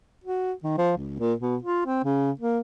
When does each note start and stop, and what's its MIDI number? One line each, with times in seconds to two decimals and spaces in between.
0.24 0.52 66
0.64 0.73 51
0.78 0.94 53
0.97 1.15 37
1.19 1.34 46
1.40 1.56 47
1.62 1.85 65
1.85 2.02 60
2.04 2.31 49
2.39 2.59 58